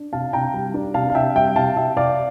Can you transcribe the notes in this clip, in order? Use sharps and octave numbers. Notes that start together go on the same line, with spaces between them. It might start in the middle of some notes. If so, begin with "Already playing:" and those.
Already playing: D4
C3 F5 A5
C3 G5 A#5
G3
D4
C3 F5 A5
F5
C3 E5 G5
G3 E5 G5
C3 F5 A5
C3 E5 G5
C3 D5 F5